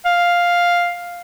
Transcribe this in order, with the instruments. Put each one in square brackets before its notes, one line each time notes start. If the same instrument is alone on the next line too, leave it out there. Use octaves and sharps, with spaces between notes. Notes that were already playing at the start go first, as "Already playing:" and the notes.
[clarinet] F5